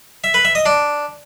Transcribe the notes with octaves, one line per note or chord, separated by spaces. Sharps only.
E5
B4
E5
D#5
D4